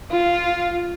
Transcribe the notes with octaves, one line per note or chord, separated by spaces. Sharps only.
F4